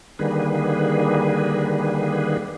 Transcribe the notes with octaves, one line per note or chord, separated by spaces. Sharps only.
D3 D#3 G3 A#3 G#4 B4